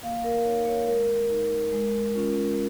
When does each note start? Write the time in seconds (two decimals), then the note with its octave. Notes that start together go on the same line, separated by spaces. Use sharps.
0.03 A#3 F5
0.24 A#4
0.45 D#4 C#5
0.66 C#5
0.87 G#3 A#4
1.30 D#4
1.72 G#3
2.15 C#4 F4